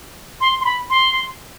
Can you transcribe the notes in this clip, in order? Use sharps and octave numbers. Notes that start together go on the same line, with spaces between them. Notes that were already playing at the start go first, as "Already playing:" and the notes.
C6
C6
B5
C6